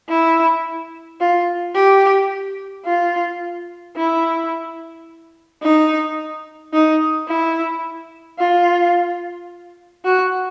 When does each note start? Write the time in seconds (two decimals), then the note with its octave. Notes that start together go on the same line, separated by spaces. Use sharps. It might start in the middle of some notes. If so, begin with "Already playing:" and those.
0.09 E4
1.20 F4
1.76 G4
2.85 F4
3.96 E4
5.62 D#4
6.73 D#4
7.28 E4
8.39 F4
10.05 F#4